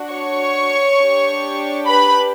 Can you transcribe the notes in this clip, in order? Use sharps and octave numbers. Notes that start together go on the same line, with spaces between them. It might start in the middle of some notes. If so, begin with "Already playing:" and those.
Already playing: D4 F#4
C#5 C#6
D4 G4
B4 B5